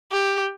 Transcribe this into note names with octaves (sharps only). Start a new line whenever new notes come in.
G4